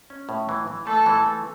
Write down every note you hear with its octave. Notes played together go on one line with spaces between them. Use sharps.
C#4
A2
E3
E3
A3 A4
E3
A3